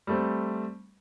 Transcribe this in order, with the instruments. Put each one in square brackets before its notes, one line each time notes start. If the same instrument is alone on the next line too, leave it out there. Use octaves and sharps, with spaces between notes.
[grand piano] G3 A3 C4